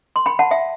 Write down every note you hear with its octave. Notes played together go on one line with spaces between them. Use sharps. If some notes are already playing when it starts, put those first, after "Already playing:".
C6
G5 B5
F#5 A5
E5 G5